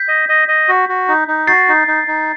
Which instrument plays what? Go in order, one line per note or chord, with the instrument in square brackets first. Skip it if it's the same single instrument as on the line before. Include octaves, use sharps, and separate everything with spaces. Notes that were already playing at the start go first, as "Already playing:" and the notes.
Already playing: [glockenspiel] G6 B6
[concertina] D#5
D#5
D#5
F#4
F#4
D#4
D#4
[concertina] F#4 [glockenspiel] A6 C7
[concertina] D#4
D#4
D#4